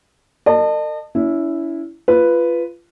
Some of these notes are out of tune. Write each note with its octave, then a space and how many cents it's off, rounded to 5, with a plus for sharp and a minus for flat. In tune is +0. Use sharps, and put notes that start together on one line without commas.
A#4 -45 D#5 -40 A5 +15
C#4 +40 E4 +0
F4 -20 B4 +0